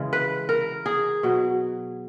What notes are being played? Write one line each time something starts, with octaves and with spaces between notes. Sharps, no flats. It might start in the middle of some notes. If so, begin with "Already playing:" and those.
Already playing: C#3 E3 G#3
B4
A#4
G#4
B2 F#3